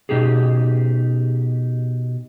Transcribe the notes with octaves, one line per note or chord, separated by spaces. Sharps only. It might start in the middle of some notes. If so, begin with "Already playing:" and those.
B2 C#4 D#4 G4 G#4